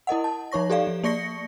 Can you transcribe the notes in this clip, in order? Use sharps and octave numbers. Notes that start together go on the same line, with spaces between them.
E4 A#4 D#5 F#5
A5
F3 D#4 C#5 C#6 A#6
G4 A4 D5 F5
F3
A#3 D5 C#6 A#6 C#7